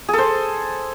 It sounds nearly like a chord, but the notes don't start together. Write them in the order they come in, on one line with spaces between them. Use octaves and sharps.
G#4 A4 C5